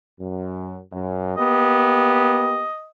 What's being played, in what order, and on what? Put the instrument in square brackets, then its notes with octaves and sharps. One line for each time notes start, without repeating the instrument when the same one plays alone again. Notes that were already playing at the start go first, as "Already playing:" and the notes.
[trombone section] F#2
F#2
[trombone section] A#3 B3 G4 [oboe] D#5